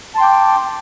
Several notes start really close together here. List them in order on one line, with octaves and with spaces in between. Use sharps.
A5 C6 G5 D6